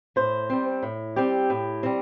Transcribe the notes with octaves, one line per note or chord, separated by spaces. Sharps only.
A2 C5
G3 C4
A2
G3 C4 G4
A2
G3 C4